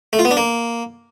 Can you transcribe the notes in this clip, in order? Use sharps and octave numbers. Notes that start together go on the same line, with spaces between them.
A3
F4
B3
D4
A#3